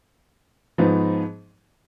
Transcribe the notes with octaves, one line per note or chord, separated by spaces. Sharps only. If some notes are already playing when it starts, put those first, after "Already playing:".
G#2 F3 B3 D#4